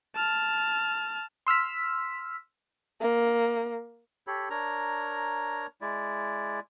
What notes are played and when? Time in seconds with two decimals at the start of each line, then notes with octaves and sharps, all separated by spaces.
0.15 A5 F6
1.47 C6 E6 F6 B6
3.01 A#3
4.27 G4 A4 C#5 B5
4.50 D4 A#4 C#5 A#5
5.81 G#3 E4 D5